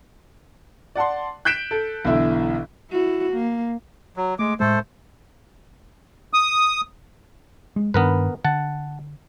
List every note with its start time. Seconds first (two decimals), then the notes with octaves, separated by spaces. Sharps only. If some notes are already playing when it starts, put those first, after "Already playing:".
0.95 D5 F#5 A5 C6
1.45 F#6 G6 B6 D7 E7
1.71 A4
2.05 B1 D3 E3 E4 E5
2.91 E4 F#4
3.33 A#3
4.17 F#3
4.39 G#3 A3 D6
4.60 A2 G#3 A3 A4 C5
6.33 D#6
7.76 G#3
7.94 G2 D#3 B3 D4 A#4 B4
8.45 D3 F#5 A5